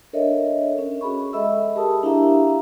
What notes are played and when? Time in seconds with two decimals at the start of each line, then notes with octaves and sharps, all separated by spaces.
0.13 D4 A4 A#4 C#5 D#5 E5
0.78 C#4
1.01 F#4 G#4 B5 C#6
1.33 G#3 A4 D#5 E5 B5 E6
1.75 G4 G#4 A#4 A5 D#6
2.03 D4 E4 G4 E5 F5 A#5